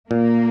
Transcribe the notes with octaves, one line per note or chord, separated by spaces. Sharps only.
A#2 A#3